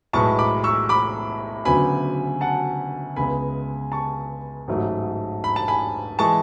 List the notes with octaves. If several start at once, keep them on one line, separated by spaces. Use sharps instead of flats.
B1 A2 G#3 B3 A5 C#6
B5 D6
C#6 E6
B5 D6
D2 C#3 F#3 B3 G#5 B5
F#5 A5
C#2 C#3 G#3 B3 G#5 B5
A5 C#6
A1 G#2 F#3 A3
B5
A5
G#5 B5
E3 G#3 A5 C#6